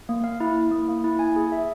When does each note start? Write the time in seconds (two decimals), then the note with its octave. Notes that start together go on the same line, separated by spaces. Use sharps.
0.09 A#3
0.24 F5
0.40 E4
0.56 E4
0.72 A#3
0.88 A#3
1.04 E4
1.19 G#5
1.36 G#4
1.52 E5